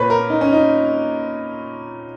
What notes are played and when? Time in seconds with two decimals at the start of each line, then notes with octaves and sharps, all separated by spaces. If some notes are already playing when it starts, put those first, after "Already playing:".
Already playing: A#2 B4 C#5
0.10 A#4
0.30 D#4
0.41 C#4
0.53 D#4